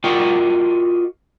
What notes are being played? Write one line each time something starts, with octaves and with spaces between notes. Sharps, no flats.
F4 F#4 A#4 D5 D#5 G5